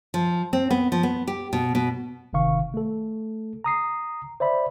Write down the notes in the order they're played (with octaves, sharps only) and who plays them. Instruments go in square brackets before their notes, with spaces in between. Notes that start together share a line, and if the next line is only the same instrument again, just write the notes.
[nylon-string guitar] F3
C4
B3
F3
B3
G4
B2
B2
[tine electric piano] G1 C3 D#3 F5 C#6
A3 A4
A#5 D#6 C7
C5 D5 E5 B5